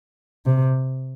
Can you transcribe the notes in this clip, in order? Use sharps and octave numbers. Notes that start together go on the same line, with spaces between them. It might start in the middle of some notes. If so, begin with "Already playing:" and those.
C3